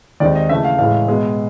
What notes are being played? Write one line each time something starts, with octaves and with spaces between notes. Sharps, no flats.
D#2 D#3 G#3 C4 D#4 D5
D#5
C#3 E3 A3 E5
F5
A2 E3 G#3 F5
B2 G#3 B3